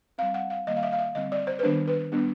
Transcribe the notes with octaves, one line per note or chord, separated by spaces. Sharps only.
G3 C4 F5
F#5
F5
D#3 G3 A#3 D#5
F5
E5
F5
E5
D3 G3 C4 D#5
D5
C5
B4
D#3 G3 B3 D4 C5
B4
G3 B3 D4